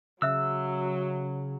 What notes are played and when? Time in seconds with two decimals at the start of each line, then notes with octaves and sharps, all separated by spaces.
0.22 C#3 F#3 E5 E6 F#6